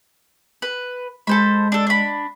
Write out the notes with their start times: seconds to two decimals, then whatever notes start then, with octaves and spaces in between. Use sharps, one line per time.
0.62 B4
1.27 G#3 A4 C5 B5
1.72 D4 A4
1.87 D4 B5